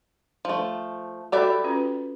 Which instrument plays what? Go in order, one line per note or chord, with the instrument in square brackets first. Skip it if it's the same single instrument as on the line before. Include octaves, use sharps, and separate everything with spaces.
[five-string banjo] F3 A3
[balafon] F#4 A4 B5 [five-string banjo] G4 D5 E5
[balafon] C#4 F4 B4